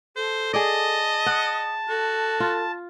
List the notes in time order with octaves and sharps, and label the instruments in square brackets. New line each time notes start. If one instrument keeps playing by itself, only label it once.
[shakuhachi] A4 [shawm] C5
[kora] G#4 D5 [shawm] D#5 [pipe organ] A5
[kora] F#5 [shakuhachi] D#6
[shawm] F#4 [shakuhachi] A4
[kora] F4